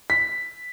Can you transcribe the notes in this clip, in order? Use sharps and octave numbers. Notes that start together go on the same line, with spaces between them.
B6